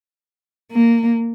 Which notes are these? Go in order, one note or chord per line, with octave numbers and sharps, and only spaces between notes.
A#3